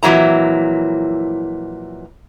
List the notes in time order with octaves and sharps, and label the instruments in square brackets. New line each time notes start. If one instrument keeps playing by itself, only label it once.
[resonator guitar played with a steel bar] F2 A#2 E3 F#3 E4 A#5